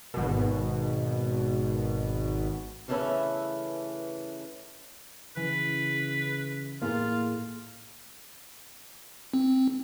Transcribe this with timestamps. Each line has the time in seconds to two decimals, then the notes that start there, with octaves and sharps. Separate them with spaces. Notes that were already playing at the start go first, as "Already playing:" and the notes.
0.14 G#1 B2
2.88 C#3 E3 A3 C#4 B4 E5
5.36 C#3 E3 B4 G#5 B6
6.82 A2 A#3 F4 G#4 A6
9.34 C4